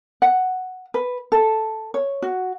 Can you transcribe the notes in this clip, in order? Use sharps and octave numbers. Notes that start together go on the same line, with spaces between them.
F#5
B4
A4
C#5
F#4